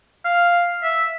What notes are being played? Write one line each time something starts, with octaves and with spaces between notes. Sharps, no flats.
F5
E5